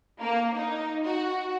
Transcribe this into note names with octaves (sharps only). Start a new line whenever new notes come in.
A#3
D#4
F#4